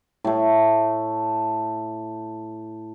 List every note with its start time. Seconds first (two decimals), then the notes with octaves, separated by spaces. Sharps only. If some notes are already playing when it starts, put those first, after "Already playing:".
0.24 A2 A3